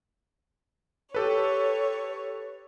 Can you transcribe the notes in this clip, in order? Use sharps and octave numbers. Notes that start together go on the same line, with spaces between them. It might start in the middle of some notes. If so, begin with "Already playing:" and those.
G4 A4 B4 C#5